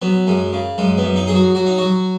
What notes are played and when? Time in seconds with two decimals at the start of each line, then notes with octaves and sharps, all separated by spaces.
0.02 F#3 B3
0.27 F#2 G#3
0.53 C#3
0.78 F#2 G#3
0.98 B3
1.03 F#2
1.16 D#4
1.27 F#3 G#4
1.35 F#4
1.55 F#3 F#4
1.67 D#4
1.78 F#3 F#4